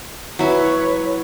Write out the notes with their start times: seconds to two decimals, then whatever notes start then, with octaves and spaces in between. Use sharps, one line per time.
0.39 F#3 E4 B4 C#5